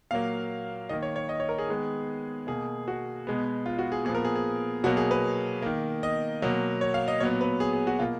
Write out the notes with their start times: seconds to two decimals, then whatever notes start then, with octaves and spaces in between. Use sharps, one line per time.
0.11 A#2 F#3 A#3 F5
0.89 D#3 A#3 D#5
1.02 C#5
1.16 C#5
1.29 D#5
1.40 C#5
1.49 A#4
1.58 G#4
1.68 D#3 G#3 B3
2.47 B2 A#3 G#4
2.88 F#4
3.27 B2 G#3 B3
3.66 F4
3.79 F#4
3.92 G#4
4.05 A#2 F3 B3 G#4
4.15 A#4
4.25 G#4
4.36 G#4
4.84 B2 F#3 A#3 F#4
4.97 G#4
5.11 B4
5.62 D#3 A#3
6.03 D#5
6.42 B2 F#3 A#3
6.81 C#5
6.94 F5
7.08 D#5
7.20 A#2 F#3 B3 C#5
7.41 B4
7.60 G#4
7.73 G#4
7.87 F#4
7.99 B2 A#3 F4